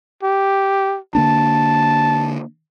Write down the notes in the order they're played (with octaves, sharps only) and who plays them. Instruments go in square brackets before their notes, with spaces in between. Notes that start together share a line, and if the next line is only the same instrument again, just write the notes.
[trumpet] G4
[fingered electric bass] D3 A#3 D4 [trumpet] A5